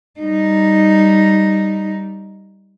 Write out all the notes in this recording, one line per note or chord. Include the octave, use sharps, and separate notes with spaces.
G3 D#4